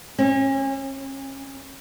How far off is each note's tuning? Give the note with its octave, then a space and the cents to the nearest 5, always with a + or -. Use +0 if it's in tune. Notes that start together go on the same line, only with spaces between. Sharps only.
C#4 -35